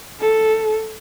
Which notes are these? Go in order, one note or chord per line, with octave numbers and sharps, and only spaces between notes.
A4